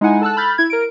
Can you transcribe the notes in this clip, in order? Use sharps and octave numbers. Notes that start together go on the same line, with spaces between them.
G#3 D#4 E4 F#5 G#5
A4 A5 E6 F#6
B5 F6 G6 A6
E4 G#6
A#4 D7